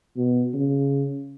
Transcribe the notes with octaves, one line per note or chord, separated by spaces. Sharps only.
B2
C#3